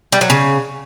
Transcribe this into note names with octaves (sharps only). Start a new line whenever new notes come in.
G3
F#3
C#3